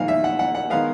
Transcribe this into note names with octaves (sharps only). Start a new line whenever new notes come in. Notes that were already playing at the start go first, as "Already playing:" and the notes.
Already playing: A#1 G#2 D#3 F5
E5
F#5
F#5
F#5
D#3 G#3 B3 F5